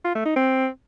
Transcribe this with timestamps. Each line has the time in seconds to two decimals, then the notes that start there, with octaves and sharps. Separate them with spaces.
0.05 F4
0.15 A3
0.26 D#4
0.36 C4